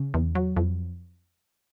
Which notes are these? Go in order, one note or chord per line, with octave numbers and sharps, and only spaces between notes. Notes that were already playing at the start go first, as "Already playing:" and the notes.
Already playing: C#3
E2
F#3
F2